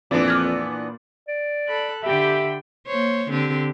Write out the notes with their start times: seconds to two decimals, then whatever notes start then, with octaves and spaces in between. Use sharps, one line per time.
0.11 F2 A#2 E3 B3 D4 D5
0.28 D6 F6 G#6
1.28 D5
1.66 A4 B5 F#6
2.03 D3 G4 E5 G5 B5
2.87 A#3 C5 C#5
3.30 D3 C4 G4